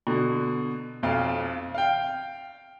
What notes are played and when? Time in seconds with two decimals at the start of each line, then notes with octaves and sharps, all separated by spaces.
0.07 B2 D3
1.03 B1 F2 F5
1.75 F5 G5